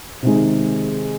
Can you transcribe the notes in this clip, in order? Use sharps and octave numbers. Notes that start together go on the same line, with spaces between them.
C3 D#3 G#3